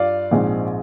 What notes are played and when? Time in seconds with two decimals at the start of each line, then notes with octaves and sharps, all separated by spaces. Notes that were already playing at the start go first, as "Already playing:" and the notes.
Already playing: G2 F4 D5 F5
0.31 A#1 G#2 F3 G#3 C4